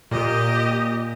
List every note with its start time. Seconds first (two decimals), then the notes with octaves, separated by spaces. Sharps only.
0.11 A#2 G4 D#5